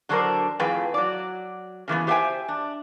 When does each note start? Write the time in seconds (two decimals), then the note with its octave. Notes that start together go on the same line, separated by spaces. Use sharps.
0.09 D3 F#3 D4 G4 A#4 C5
0.59 F2 A2 F3 G#4 B4 G5
0.94 F#3 D5
1.88 C#3 E3 A3 B3
2.07 G4 C5 E5 F5 G5 G#5
2.48 D4